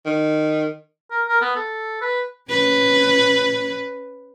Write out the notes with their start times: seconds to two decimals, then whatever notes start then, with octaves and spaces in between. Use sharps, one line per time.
0.06 D#3
1.11 A#4
1.28 A#4
1.41 B3
1.56 A4
2.02 B4
2.50 C#4 B4